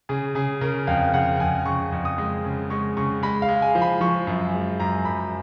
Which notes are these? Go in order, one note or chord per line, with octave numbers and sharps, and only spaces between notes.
C#3 G#4
C#3 G#4
C#3 A#4
F2 F5
C#3 F#5
F2 G#5
C#3 C#6
F2
D#6
G#3
C#3
G#3 C#6
C#3 C#6
G#3 B5
F5
G#3
G#5
F3
B5
F3 C#6
F#2
G#3
F#2 A#5
F#2 B5